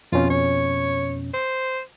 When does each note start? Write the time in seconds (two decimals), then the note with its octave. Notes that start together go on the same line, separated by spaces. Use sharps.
0.12 F2 B2 C#4 F4
0.30 C#5
1.34 C5